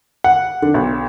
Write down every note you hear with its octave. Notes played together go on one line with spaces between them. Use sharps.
F#5
D3
B1